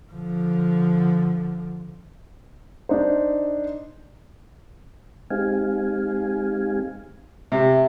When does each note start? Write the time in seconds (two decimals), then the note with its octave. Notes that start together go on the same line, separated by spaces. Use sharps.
0.11 D3 F3
2.89 D4 D#4 C5
5.30 G#3 C4 D#4 G4 F5 G#5
7.52 C3